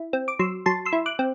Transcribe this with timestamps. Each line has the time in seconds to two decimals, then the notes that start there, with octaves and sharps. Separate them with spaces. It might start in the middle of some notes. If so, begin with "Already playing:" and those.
Already playing: E4
0.13 C4
0.28 D6
0.39 F#3 C6 E6
0.66 F#3 A5 C6
0.85 C6 E6
0.93 E4
1.06 D6 F#6
1.19 C4